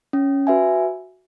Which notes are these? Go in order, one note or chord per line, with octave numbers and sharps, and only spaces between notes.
C#4
F#4 B4 E5 G#5